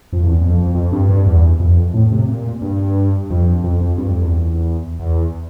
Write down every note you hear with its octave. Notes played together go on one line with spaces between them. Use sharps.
F2
E2
F2
F2
F2
G2
G2
E2
F2
A2
C3
A#2
G2
F2
F2
F2
G2
F2
E2
E2